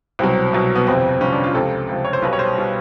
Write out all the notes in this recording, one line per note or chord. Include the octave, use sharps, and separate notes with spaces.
C2 B2 F#3 C4
C2 B2 F#3
B3
G1 F2 C3 C4
G1 F2 C3 C#4
D4
F4
C#2 C3 F3 A4
C#2 C3 F3
C#5
C5
B1 B2 G3 B4
C#5
C5
B2 G3